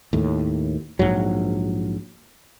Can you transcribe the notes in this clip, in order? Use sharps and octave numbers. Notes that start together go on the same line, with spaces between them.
D#2 A2
A#1 D#2 G#2 F#3